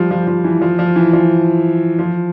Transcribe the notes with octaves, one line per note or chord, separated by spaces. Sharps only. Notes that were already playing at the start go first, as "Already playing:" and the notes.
Already playing: F3 G3
F3
F3
E3
F3
F3
E3
F3
F3